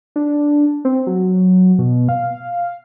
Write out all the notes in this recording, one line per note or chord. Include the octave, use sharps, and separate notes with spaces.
D4
C4
F#3
B2
F5